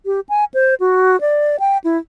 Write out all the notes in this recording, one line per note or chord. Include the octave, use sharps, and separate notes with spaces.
G4
G#5
C5
F#4
D5
G5
E4